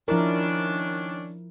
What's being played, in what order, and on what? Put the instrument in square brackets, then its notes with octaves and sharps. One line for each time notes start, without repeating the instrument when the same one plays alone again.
[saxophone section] D#3 C#4 D4 [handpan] F3 E4 A#4